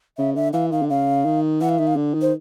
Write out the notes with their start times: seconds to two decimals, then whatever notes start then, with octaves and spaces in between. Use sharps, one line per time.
0.18 C#3 E5
0.36 D3 E5
0.53 E3 F5
0.71 D#3 F5
0.82 D3
0.90 C#3 F5
1.25 D#3
1.61 E3 F#5
1.69 F5
1.79 D#3 E5
1.87 F5
1.96 D3
2.14 D#3
2.22 C5